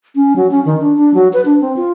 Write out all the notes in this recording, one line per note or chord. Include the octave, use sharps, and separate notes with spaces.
C#4
F#3
C#4
D#3
D4
D4
F#3
B4
D4
C4
F4